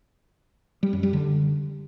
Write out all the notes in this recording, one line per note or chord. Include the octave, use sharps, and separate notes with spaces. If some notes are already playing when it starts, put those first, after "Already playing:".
G3
F#2
G3
D3